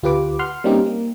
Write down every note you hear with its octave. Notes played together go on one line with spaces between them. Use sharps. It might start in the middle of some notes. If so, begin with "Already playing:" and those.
D2 F4 G4 B4 D6
F#5 C6 F6
G3 A#3 C4 C#4 D#4 G4
A#3